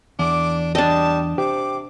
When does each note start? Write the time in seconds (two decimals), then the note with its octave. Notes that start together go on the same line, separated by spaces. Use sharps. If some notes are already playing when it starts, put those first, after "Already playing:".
0.19 E2 D4 D6
0.75 G3 D4 D#5 A5
1.38 C3 G4 D6